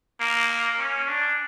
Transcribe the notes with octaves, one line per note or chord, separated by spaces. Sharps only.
A#3
C#4
D4